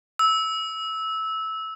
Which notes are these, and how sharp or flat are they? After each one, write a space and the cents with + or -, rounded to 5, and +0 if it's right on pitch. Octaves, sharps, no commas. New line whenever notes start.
E6 -15